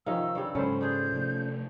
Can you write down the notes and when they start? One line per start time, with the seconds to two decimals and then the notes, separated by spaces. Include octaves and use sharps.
0.06 C3 D#3 F3 C#4 D#5 F5 E6
0.35 G2 C#3 G3
0.55 G#2 C#3 F#3 G#3 C#4 A4 C5 B5
0.81 D4 F4 G#4 G6
1.12 C3 F3 A3